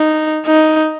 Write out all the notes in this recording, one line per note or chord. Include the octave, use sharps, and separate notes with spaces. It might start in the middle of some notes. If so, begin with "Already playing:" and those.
Already playing: D#4
D#4